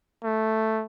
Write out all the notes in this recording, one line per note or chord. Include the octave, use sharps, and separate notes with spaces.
A3